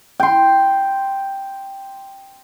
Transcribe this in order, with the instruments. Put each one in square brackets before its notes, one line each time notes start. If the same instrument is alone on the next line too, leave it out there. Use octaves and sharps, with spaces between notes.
[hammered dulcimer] G5 C6